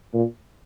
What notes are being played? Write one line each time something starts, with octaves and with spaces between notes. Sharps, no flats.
A#2